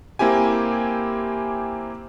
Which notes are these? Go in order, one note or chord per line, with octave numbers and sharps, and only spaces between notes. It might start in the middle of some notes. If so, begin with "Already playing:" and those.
A#3 C4 E4 G4 G#5